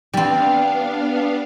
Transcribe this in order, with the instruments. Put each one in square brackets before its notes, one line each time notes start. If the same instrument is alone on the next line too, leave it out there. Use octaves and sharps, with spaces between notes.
[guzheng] G3 C4 [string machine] B3 D4 F5